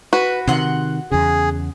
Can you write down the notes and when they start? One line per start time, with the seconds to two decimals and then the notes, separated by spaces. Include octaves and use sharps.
0.13 F#4 B4
0.48 C3 D#3 F#5 C6
1.11 E2 C#3 G#4